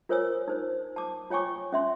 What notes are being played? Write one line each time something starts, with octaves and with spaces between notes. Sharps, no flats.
F4 A#4 C5 C#5 G#5 E6
D#4 C5
A5 D6
F4 C#5 G5 G#5 C#6 D6
C#4 E5 C6